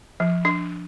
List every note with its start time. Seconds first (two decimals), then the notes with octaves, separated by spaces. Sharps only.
0.20 F3
0.45 D4